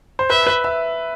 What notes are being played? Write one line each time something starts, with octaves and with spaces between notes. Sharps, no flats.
C5
B4 E5
B4
E5